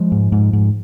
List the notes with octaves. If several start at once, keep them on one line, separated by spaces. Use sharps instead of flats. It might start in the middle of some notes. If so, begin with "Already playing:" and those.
Already playing: F3 G#3
G#2
G#2
G#2